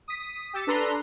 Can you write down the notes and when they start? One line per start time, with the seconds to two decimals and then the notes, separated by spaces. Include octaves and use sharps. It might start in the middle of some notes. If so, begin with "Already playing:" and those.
0.08 D#6 B6
0.53 G4 E6 A6 C#7
0.67 D4 A4 B4 A#5 C6